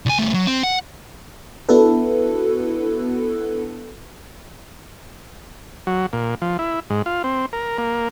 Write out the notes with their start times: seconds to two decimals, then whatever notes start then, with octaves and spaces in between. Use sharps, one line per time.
0.06 C2 G#5
0.19 G3 A3
0.34 F#3
0.47 C4
0.63 F#5
1.69 B3 D4 E4 F#4 A4 B4
5.87 F#3
6.13 A#2
6.42 F3
6.59 E4
6.90 G#2
7.06 F4
7.24 C4
7.53 A#4
7.78 A#3